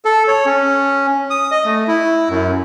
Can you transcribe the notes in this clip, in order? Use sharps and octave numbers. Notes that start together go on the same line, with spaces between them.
A4
C#5
C#4
D#6
D#5
A3
E4
F#2